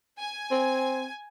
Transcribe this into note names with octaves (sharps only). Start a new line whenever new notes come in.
G#5
C4